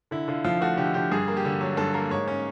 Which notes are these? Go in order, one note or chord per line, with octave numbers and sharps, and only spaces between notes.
D3 E4
D3 F4
F3 F4
A3 F#4
D3 G4
D3 G4
G2 G#4
A#3
G4
D3
F#3
G2 A4
A#3 A#4
G#2 C#5
C#4